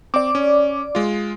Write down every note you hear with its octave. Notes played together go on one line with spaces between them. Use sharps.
C4 D5 D6
C#4
G#3 F4